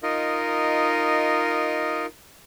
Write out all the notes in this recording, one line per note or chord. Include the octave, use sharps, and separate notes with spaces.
D#4 F4 A#4 D#5